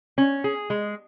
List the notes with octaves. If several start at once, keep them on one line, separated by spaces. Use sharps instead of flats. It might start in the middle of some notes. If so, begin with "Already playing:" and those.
C#4
G#4
G#3